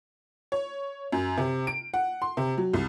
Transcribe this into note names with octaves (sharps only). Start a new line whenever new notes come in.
C#5
F#2
C3
D7
F#5
C6
C3
F#3
C2